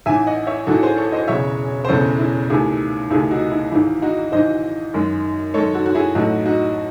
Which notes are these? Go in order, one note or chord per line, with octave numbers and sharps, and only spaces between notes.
A1 G#2 E3 E5 G#5
D#5 F#5
C#5 E5
A1 G#2 E3 F#4 A4
G#4 C5
A4 C#5
C5 D#5
E1 E2 C#3 C#5 E5
C5
E1 E2 C#3 A4 C#5
E4
C#2 C3 D#3 A3 E4 G#4
C#2 C3 D#3 A3 E4 G#4
D#4 F#4
E4
G#1 G#2 E3 E4
D#4 F#4
G#1 G#2 E3 C5 D#5
F#2 D#3 G#3
F#2 D#3 G#3 A4 C#5
F#4 A4
F#4
E4 G#4
A1 A2 F#3 A3 D#4 F#4
D#4 F#4